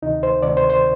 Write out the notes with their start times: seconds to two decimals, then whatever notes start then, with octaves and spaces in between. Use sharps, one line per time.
0.02 D2 C3 D#3 D#4
0.23 C5
0.42 D2 C3 D#3 D5
0.57 C5
0.70 C5